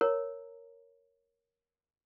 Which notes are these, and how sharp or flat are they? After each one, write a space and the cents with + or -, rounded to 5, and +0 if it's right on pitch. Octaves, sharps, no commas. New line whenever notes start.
A#4 +0 C#5 +0 A#5 -20